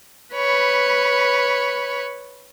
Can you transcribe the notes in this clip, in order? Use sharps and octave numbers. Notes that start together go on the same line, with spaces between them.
B4 C#5 B5